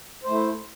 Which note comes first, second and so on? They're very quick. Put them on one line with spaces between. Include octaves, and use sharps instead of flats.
C5 A3 E4